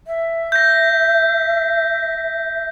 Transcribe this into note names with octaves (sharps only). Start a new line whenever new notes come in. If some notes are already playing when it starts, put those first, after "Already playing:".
E5
G6 A#6